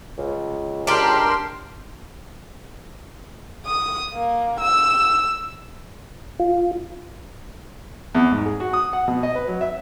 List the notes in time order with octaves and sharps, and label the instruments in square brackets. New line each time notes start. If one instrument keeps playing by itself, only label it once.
[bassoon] C#2
[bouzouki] D4 G4 [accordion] A#4 C6
[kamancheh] D#6
A#3
E6
[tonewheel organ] F4
[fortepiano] E2
G#2
G#4
F#4
D#6
F#5
B2
D#5
B4
F#3
E5